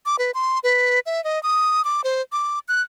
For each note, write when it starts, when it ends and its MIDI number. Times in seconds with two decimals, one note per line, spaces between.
0.06 0.16 86
0.19 0.31 71
0.34 0.59 84
0.64 1.00 71
1.06 1.23 76
1.24 1.41 75
1.43 1.84 87
1.84 2.01 86
2.04 2.22 72
2.32 2.59 86
2.68 2.82 90